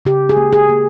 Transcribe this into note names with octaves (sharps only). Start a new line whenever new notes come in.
C#3 G4
G#4
A#3
G#4
A#3